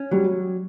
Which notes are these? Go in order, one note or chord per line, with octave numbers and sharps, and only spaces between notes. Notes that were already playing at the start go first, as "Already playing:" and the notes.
Already playing: C#4
F#3 G3